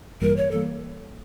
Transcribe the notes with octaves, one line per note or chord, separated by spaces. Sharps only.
A1 G2 E3 G3 A#3 A#4
C#5
E3 G3 A#3 A4